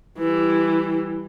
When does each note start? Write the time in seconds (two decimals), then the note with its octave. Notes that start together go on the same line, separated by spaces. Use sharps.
0.18 E3 G3